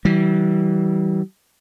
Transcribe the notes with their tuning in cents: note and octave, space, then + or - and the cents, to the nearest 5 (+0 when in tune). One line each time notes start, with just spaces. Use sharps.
E3 -25 G3 -35